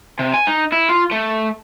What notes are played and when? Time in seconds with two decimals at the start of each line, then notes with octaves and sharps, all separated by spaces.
0.19 C3
0.34 G#5
0.47 D#4
0.72 E4
0.89 F4
1.11 A3